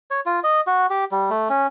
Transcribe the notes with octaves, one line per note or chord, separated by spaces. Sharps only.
C#5
F4
D#5
F#4
G4
G3
A3
C#4